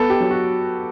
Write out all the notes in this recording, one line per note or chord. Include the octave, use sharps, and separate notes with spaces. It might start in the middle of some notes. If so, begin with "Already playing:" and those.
Already playing: B3 A4
G4
F#3
F#4